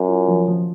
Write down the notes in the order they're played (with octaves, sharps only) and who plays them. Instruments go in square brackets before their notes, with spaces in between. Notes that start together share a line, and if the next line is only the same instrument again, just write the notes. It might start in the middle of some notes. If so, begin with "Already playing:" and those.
Already playing: [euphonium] F#2
[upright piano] F4
F3
F3